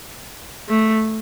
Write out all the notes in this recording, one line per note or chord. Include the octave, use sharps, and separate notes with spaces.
A3